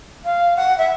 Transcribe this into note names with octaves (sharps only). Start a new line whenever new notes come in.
F5
F#5
E5